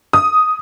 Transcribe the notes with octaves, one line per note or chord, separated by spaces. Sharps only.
D#6